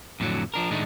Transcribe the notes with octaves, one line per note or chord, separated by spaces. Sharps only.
F2 A2 D3 E3 F#3
F3 D4 A#4
A2 D#3 G#3 A3 D4 D#4